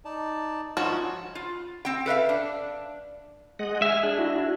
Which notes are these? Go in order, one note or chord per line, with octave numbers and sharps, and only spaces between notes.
D#4 D5 A5
G2 F3 C#4 D#4 F4 F#4 A5
F4
C4 G5
A4 B4 E5 F5
D4
G#3 D#5 F#5
E5 G#5 F6
D4 G#4
E4 F#4